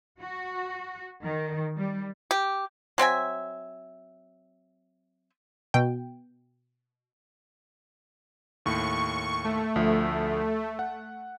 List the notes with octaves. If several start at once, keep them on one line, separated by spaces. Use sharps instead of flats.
F#4
D#3
G3
G4
F#3 C4 E5 G#5
B2 G5
D#2 A2 C#6
A3
D2 F3 E5
F#5